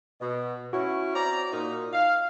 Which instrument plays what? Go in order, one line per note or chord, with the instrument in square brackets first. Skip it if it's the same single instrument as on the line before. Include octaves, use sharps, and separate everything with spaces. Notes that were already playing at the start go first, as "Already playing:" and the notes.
[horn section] B2
[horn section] C#4 E4 [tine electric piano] F#4
[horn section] C4 D5 A#5
A#2 D#4
F5